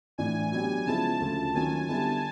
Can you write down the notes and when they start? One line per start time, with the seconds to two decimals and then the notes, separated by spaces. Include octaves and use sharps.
0.18 A2 E3 A3 D4 G#5
0.52 F#3 B3 D4 G4 G#5
0.86 C#3 F3 G#3 B3 E4 A5
1.20 D2 C#3 F3 A3
1.55 D#3 F#3 A#3 C#4 F4 G#5
1.88 D3 G3 B3 E4 A5